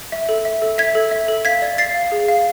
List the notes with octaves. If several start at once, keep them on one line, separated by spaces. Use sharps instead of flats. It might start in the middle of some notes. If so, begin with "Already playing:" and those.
E5
A4
E5
A4
E5 G#6 B6
A4
E5
A4
F5 G#6 B6
D5
D5 A6 C7
F5
G#4
F5